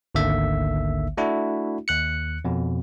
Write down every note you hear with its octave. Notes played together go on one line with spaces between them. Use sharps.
G#1 D2 D3 D#3 A#3 E5
A3 D4 E4 F#4
D#2 F#6 C#7
F2 B2